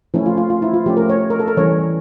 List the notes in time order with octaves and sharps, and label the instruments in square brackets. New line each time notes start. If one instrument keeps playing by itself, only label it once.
[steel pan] F3 A3 C#4 E4
F4
F4
F4
E4
F4
F3 A3 C#4 G4
A#4
C#5
A#4
A4
A#4
E3 G3 C#4 C#5